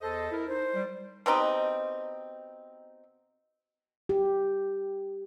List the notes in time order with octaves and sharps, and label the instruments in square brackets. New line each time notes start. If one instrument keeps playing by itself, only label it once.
[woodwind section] E2 C5 D#5 [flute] A4
[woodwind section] E4 A#4
[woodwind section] D#4 [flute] C5
[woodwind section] G3
[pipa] B2 C4 D#4 G4
[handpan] G4